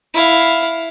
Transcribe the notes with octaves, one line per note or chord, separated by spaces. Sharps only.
E4 F5